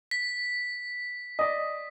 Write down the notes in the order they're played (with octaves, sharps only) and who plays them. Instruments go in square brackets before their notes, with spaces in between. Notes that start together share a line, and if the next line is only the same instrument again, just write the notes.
[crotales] B6
[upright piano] D5 D#5 [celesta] D#6